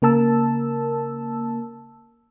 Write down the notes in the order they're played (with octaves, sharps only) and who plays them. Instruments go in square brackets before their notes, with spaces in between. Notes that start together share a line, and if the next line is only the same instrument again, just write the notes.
[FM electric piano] C#3 A#3 A#4 A5 E6